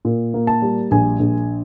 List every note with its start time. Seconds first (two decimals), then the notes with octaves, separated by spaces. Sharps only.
0.05 A#2
0.34 A#3
0.47 A5
0.62 G3
0.91 A#1 G#5
1.19 A#1